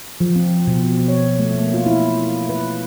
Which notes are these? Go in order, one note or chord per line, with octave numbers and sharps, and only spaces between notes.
F3
C4
B2
C#5
A3
A#3
F4
E4
B4